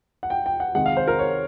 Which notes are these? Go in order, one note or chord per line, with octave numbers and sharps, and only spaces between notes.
F#5
G5
G5
F#5
C3 D#3 G#3 F#5
F5
C5
A#4
C#5